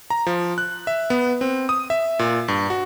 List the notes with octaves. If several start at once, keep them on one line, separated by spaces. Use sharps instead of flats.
A#5
F3
F#6
E5
B3
C4
D#6
E5
A#2
G2
F#4